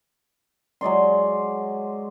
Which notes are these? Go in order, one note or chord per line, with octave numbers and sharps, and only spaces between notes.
F#3 G#3 D5 C6